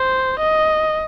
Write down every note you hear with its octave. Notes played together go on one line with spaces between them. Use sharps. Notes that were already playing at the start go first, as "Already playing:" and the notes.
Already playing: C5
D#5